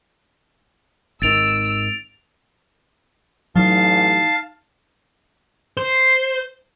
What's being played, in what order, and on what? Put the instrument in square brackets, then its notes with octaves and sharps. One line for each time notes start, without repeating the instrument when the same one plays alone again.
[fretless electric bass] G#1 D#3 [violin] E6 [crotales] A6 D7 F7
[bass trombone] A1 [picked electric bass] F#3 [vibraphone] D#4 [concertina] F5 A5
[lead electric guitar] C5